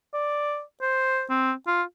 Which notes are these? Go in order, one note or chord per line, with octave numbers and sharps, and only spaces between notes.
D5
C5
C4
F4